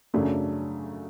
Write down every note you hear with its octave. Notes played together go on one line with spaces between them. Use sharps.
F#2 C#3 F#3 A3 D4